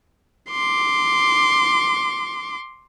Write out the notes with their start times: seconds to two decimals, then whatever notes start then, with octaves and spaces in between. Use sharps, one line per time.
0.50 C6 D6